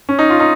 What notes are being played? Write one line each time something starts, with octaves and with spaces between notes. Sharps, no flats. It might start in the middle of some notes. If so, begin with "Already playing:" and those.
C#4
D#4
F4
D#4